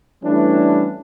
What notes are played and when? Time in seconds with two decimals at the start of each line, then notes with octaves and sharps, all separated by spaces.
0.23 E3 G3 A3 C#4 D4